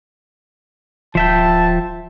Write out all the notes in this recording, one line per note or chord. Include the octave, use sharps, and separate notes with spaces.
D1 F3 E5 G5 A5